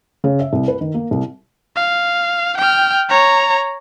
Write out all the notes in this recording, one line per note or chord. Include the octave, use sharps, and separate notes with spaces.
C#3
E5
C2
B4
D#3
A#3
C2
F5
G5 F6
C#5 A#5